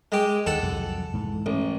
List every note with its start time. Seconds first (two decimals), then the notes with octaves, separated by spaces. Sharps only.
0.12 G#3 G4
0.46 D2 D#3 A4 F#5
0.63 C2 F2 F#3
1.14 G#2 E3
1.46 A1